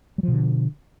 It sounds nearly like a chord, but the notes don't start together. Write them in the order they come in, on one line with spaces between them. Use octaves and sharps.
G3 F3 B2 D3